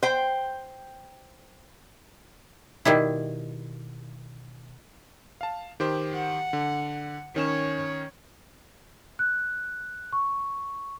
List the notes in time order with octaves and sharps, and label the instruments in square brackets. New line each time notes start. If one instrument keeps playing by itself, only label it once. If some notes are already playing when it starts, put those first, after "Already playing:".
[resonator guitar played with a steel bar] C5 G5
[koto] B2 D#3 G3 E4
[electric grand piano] F5 A5
D#3 G4 C5
[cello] F#5
[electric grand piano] D3
[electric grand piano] D#3 C#4 E7 [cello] C#5
[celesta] F#6
C#6